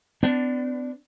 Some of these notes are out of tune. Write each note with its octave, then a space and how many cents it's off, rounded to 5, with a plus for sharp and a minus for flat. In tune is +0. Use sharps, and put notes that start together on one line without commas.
B3 +45 D4 +0